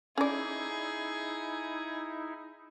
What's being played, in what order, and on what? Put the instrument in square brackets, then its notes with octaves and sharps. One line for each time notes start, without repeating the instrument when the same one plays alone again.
[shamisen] C#4 D5 [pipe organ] D#4 E4 [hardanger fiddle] G#4